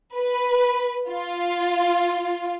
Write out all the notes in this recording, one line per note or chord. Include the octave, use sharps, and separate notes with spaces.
B4
F4